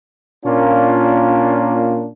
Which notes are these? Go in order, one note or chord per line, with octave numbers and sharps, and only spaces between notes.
A#2 A#3 C#4 D4 F4